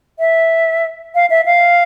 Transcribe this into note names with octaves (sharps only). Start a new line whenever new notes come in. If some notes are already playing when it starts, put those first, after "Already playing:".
E5
F5
E5
F5